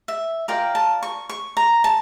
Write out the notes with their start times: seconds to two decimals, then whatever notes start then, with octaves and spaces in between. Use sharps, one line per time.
0.08 E5
0.48 F4 A#4 D5 G5
0.75 A5
1.03 C#6
1.29 C#6
1.57 A#5
1.84 A5